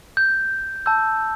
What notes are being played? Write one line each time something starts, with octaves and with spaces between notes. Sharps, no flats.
G6
A5 E6 G6